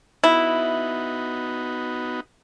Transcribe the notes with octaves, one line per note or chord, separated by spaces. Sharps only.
B3 D#4 E4 F#4